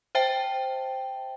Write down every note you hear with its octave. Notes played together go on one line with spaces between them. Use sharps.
C5 E5 G5 A5